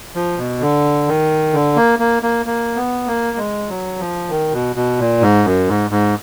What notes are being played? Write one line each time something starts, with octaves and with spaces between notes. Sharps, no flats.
F3
B2
D3
D#3
D3
A#3
A#3
A#3
A#3
B3
A#3
G#3
F#3
F3
D#3
B2
B2
A#2
G#2
F#2
G#2
G#2